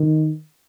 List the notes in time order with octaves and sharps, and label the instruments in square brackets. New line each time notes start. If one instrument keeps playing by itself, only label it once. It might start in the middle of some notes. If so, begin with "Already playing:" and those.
Already playing: [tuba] D#3